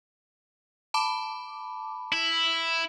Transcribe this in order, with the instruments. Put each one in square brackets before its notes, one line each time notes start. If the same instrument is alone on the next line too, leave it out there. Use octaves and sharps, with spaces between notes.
[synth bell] A5 B5 D6
[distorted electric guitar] E4